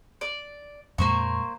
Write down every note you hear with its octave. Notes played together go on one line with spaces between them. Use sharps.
D5
F2 A#2 G#3 A#3 C5 C#6